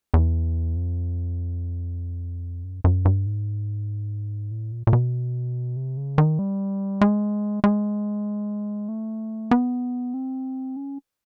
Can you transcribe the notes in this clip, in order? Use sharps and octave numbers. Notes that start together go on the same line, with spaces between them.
E2
F2
F#2
F#2
G2
G#2
A2
A#2
A#2
B2
C3
C#3
D#3
G3
G#3
G#3
A3
B3
C4
C#4